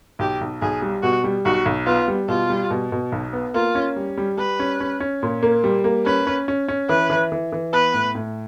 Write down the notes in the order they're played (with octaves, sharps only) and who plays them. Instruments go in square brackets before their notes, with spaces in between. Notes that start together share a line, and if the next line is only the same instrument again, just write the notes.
[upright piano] B1 [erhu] G4
[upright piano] B1
[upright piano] B1 [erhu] G#4
[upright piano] G3
[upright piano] B2 [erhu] F#4
[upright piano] G3
[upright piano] B1 [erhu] F#4
[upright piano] B1
[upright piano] B3 [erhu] F4
[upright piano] G3
[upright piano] B2 [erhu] F4
[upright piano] G3
B2
B2
B1
B3
[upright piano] A#3 [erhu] F4
[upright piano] C#4
G3
G3
[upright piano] G3 [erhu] B4
[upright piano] C#4
C#4
C#4
A#2
A#3
G3
A#3
[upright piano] C#4 [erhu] B4
[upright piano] C#4
C#4
C#4
[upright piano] E3 [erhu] B4
[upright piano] E3
E3
E3
[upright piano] B3 [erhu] B4
[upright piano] A2
A2